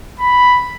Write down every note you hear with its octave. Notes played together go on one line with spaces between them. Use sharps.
B5